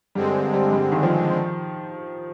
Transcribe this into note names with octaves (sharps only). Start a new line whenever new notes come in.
G2 D3 G3 G#3 C4
G3
G3
D#3
F3